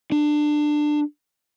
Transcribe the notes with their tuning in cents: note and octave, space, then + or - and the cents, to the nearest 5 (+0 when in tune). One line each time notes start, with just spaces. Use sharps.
D4 +20